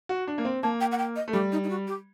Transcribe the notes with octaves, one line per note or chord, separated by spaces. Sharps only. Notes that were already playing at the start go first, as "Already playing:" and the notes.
F#4
D4
A#3
C4
A#3 A5
G5
F#5
G5
D#5
A3
G3 G4
D#4
D#4
F#4
G4